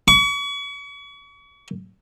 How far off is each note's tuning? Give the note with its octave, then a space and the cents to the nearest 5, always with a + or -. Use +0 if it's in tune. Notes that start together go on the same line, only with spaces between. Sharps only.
C#6 +40